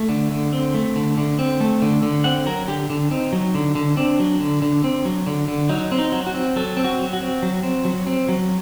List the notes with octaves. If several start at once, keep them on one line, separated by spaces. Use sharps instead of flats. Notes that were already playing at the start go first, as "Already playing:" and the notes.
Already playing: A3
D3
D3
C4
A3
D3
D3
C4
A3
D3
D3
C4 F#5
F#3 A#4
D3 G4
D3
C4 D#4
F#3
D3
D3
C4 D4
F#3
D3
D3
C4
F#3
D3
D3
F#3 D#4
C4
D#4
F#3
F#4
C4
F#3 A4
C4
F#4
F#3
F#4
C4
F#3
C4
F#3
C4
F#3